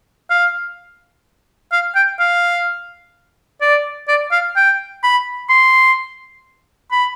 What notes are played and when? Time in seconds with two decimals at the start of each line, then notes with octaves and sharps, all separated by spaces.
0.30 F5
1.72 F5
1.95 G5
2.19 F5
3.61 D5
4.08 D5
4.32 F5
4.56 G5
5.03 B5
5.49 C6
6.91 B5